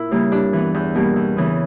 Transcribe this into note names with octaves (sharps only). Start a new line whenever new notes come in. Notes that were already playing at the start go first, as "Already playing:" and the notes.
Already playing: A#2 E4 E5
C#3 G3 A#3
G2 D4
E3 B3
E2
B2 G3 A#3
E2
C#3 E3 B3